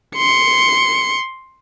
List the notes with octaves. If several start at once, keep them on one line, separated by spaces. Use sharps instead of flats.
C6 C#7